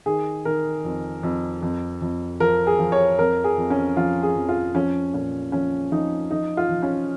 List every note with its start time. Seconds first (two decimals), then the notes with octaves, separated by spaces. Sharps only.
0.06 D#3 G#4
0.45 D#3 A#4
0.85 F2
1.23 F2
1.62 F2
2.02 F2
2.40 F3 A#4
2.67 G#4
2.79 F3
2.92 C#5
3.19 F2 A#4
3.44 G#4
3.58 F2
3.70 C#4
3.97 F3 F4
4.23 G#4
4.36 F2
4.49 F4
4.75 F3 C#4
5.14 A#2 C#4
5.52 F3 C#4
5.92 F3 D#4
6.31 F3 D#4
6.57 F4
6.69 F3
6.83 C#4